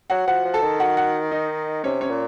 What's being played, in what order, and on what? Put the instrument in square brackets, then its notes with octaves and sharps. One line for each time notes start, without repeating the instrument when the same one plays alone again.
[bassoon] F#3 [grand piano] F#4 F#5
[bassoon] F3 [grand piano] F#4 F#5
[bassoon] F3
[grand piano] A4 A5
[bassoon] D#3
[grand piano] F#4 F#5
F#4 F#5
D#4 D#5
[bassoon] C3 [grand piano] C#4 C#5
[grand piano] C#4 C#5
[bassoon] A#2